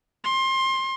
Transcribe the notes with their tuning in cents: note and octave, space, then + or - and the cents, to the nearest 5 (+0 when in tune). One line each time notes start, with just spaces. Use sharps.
C6 +25